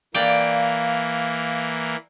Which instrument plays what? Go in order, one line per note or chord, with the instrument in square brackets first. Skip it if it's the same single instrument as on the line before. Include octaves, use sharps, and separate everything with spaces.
[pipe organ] E3 A#3 [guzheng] D5 G5 [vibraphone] F5